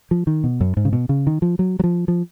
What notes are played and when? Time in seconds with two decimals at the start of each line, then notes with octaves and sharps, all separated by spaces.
0.11 F3
0.27 D#3
0.44 B2
0.61 F#2
0.77 G#2
0.85 C#3
0.93 B2
1.09 C#3
1.27 D#3
1.42 F3
1.59 F#3
1.79 F#3
1.84 F3
2.08 F3